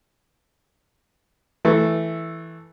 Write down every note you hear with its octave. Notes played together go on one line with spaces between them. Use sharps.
E3 A3